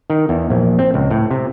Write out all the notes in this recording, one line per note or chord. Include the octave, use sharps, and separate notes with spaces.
D#3
E2
A#1
C4
C#2
A2
C3